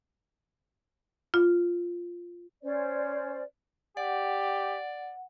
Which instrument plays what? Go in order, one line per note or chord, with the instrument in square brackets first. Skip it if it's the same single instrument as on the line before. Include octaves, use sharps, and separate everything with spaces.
[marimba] F4
[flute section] C#4 C5 D5
[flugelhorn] G4 [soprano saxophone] D5 [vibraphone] F#5